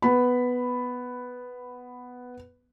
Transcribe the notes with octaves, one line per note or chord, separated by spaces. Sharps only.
B3 B5